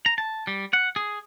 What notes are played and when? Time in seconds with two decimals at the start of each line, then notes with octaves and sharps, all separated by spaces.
0.06 A#5
0.18 A5
0.47 G3
0.73 F#5
0.96 G#4